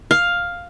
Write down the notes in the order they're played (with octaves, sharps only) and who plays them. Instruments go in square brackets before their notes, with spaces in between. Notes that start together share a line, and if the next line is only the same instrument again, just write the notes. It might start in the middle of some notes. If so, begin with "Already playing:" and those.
[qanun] F5